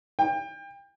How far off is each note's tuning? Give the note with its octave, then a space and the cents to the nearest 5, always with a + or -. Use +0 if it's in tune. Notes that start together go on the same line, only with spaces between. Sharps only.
G5 +30